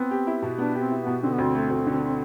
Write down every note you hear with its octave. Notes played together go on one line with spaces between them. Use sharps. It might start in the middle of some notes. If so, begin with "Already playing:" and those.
Already playing: B3 C4
G4
E4
B2
B3 D4
C4 G4
E4
B2 B3
D3 C4
B3
D2 C4
A3
D2
D3